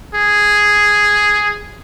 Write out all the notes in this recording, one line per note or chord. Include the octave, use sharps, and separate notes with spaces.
G#4